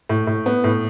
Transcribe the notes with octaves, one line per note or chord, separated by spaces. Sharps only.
A2
A2
B3
A2